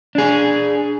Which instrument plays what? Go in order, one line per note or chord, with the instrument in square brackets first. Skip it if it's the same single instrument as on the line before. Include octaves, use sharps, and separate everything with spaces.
[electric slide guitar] D4 G#4